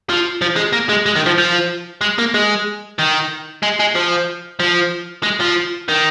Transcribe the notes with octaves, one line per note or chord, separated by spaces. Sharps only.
F3
F3
G#3
A#3
G#3
G#3
D#3
F3
F3
G#3
A#3
G#3
D#3
G#3
G#3
F3
F3
G#3
F3
D#3